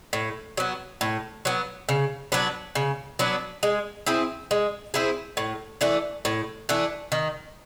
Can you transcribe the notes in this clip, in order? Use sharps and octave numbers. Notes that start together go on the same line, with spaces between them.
A2
F#3 B3
A2
F#3 B3
C#3
F#3 B3 D4
C#3
F#3 B3 D4
G#3
C4 E4 G#4
G#3
C4 E4 G#4
A2
E3 A3 D4
A2
E3 A3 D4
D#3